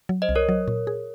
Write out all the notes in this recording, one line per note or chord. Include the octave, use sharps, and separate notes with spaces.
F#3
C5 D#5
C2
A#4 C#5
F#3
A#2
G#4